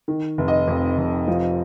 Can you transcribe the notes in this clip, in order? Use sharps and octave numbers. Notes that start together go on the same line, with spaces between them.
D#3
F1
D#5
F2
F1
F3